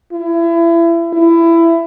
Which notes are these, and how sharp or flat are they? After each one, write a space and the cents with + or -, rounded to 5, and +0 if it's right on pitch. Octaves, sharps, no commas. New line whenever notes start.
E4 +30
E4 +20